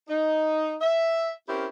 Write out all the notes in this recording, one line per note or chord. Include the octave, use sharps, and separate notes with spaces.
D#4
E5
C4 C#4 E4 G4 A#4